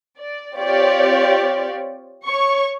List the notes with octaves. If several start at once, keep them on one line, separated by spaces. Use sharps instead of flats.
D5
C4 F4 G4 C#5 D5
C#5 C#6